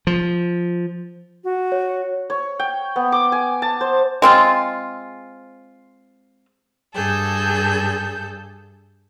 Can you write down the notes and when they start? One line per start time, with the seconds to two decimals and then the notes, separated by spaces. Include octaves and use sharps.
0.07 F3
1.44 F#4
1.72 C#5
2.30 C#5
2.60 G5
2.96 B3
3.12 D6
3.32 G#5
3.62 A5
3.81 C5
4.22 G#3 C4 F4
6.94 G2 G#4 A4 G6